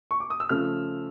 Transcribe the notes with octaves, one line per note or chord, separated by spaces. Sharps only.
C#6
D6
D#6
E6
C#3 F3 A3 F6